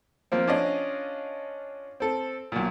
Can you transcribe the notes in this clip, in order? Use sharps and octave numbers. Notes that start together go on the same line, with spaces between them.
F3 A#3 C4
C#4 D4 F4 D#5
C4 A4
B1 A#2